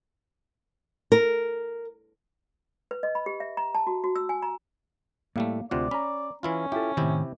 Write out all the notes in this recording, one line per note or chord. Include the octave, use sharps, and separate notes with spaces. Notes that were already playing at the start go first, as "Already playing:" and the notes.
A#4
B4
D#5
B5
G4
E5
A#5
A5
F#4
F#4
E6
G#5
A#5
A2 G3 A3 A#3 F5
D2 C3 F4 D5 F#5
C#4 A#5 B5
E3 C#4 E4 F4
E4 F4 G4 A4
A2 C3 D#3 E4 G4